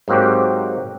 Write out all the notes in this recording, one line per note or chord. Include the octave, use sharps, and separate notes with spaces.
G#2 F#3 A#3 C4 F#4 G4